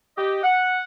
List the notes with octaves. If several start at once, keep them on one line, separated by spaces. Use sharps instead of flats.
G4 D#5
F#5